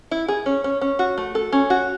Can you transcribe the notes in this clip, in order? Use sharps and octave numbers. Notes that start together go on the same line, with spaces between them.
E4
G#4
C#4
C#4
C#4
F#4
A3
A4
C#4
F#4